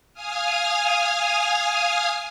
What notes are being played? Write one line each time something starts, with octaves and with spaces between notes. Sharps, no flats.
F5 G#5 D#6 F6